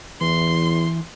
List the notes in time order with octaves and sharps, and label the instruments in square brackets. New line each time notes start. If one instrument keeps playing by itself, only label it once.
[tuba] E2 [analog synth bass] E3 [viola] C6